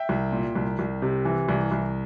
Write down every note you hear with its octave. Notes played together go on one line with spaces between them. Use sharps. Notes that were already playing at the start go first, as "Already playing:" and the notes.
Already playing: E5 G5
C2
A#2
C2
C2
C3
E3
C2
C2